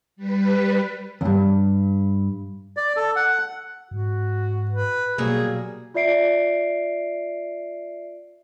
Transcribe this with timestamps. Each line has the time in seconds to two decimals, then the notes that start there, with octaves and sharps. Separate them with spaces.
0.16 G3 B4
1.21 E2 G2
2.77 D5
2.96 A4
3.16 F#5
3.91 G#2 F#4
4.71 B4
5.18 B2 F#3 G3 A#3 G#4
5.94 F4 D5 E5 C7 D7